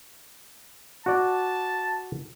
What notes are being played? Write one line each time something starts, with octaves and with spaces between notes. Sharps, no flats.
F#4 D5 A5